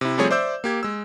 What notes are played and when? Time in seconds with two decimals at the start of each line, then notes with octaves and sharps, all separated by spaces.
0.01 C3 E4
0.18 F3 G3 A3 C4 G#4 C#5
0.31 C5 D5 E5 D6 E6 G6
0.64 A#3 G4 G#6
0.83 G#3 E6